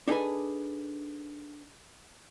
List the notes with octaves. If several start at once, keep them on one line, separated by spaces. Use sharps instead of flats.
D4 D#4 G#4 A4 B4 G#5